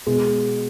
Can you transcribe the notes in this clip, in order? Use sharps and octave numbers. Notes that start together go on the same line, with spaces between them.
B2 G#3